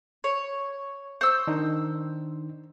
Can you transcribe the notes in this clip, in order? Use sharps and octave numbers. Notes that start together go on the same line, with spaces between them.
C#5
C5 C#6 E6 G6
D#3 D4 D#4